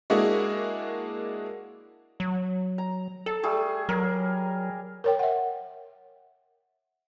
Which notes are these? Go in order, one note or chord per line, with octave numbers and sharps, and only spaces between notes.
G#3 A#3 D4 E4 F#4 G#4
F#3
A#5
A4 A5
G3 A3 G#4
F#3 A#4
A#4 C#5 G5
E5 F#5